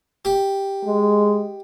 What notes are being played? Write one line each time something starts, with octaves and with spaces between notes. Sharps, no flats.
G4
G#3